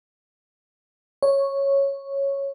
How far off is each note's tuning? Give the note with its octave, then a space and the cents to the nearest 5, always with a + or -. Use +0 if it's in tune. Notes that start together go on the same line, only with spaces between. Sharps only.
C#5 -5